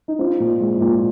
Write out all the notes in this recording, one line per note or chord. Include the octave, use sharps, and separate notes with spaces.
D#4
C4 F4
A#2
G#3
A#2